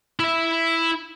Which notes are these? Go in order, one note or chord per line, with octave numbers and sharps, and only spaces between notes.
E4 E5